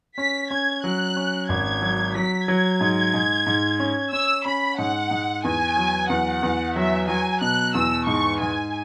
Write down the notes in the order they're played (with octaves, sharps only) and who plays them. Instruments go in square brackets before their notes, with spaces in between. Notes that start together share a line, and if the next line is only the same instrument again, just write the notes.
[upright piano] C#4 [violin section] B6
[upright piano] C#4 [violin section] G#6
[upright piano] F#3 [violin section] F#6
[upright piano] C#4
[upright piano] G#1 [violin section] G#6
[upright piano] F#3
[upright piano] F#3 [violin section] B6
[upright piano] F#3 [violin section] G#6
[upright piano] G#2
G#2
G#2
C#4
[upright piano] C#4 [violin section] E6
[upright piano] C#4 [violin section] B5
[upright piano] G#2 [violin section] F#5
[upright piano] G#2
[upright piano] E2 [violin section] G#5
[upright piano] F#3
[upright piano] E2 [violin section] F#5
[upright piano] E2
[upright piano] F#3 [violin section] E5
[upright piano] F#3 [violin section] G#5
[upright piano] B2 [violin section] F#6
[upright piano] E2 [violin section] E6
[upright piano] G#2 [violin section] C#6
[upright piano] G#2 [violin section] G#5